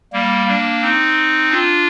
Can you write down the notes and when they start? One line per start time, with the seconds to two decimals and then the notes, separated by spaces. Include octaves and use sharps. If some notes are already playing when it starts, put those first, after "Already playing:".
0.13 G3 A#3
0.47 A#3 D4
0.82 C4 D#4
1.51 D4 F4